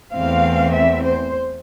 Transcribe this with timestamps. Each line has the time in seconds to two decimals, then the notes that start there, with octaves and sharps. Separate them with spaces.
0.13 E2 E3 A3 C4 F5
0.74 E5
1.04 C5